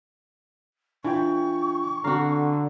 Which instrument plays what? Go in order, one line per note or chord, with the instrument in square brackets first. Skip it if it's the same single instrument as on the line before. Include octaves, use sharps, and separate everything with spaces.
[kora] E3 [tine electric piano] D4 F4 G5 [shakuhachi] C#6
[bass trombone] D3 [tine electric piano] C4 A#5 [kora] F#4 F5